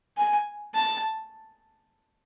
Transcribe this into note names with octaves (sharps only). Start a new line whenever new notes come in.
G#5
A5